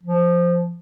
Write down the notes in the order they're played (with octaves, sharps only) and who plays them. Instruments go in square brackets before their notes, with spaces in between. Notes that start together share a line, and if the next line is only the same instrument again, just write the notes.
[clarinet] F3